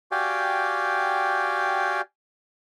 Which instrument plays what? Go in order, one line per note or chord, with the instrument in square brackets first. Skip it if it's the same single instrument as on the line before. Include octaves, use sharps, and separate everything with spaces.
[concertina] F#4 G4 D5 F5 G5 G#5